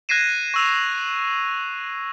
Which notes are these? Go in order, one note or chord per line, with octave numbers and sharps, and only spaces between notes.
F#6 G#6 A#6 C7 D#7 E7
C#6 E6 F7